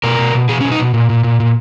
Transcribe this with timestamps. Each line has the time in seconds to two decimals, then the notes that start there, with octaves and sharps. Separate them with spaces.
0.03 B2 A#4
0.19 B2
0.34 B2
0.49 B2 G#4
0.61 C#4
0.65 B2
0.72 D#4
0.79 B2
0.94 A#2
1.10 A#2
1.24 A#2
1.40 A#2